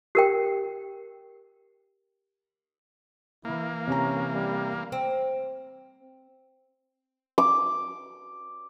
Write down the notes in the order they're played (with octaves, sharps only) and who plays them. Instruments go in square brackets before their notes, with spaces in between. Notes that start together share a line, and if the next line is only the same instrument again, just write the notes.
[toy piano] G4 A#4 G5
[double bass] E3 [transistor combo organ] A#3 [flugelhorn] E4
[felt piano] C3 A#5 [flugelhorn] C#4
[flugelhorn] G3
[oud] C4
[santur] D6